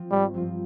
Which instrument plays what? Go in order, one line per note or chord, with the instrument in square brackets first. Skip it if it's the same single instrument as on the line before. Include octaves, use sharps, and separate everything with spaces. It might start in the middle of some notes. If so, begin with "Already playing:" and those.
Already playing: [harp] F3 C4 F4
[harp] G#1 [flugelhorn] G3
[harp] G2 F3 C4 F4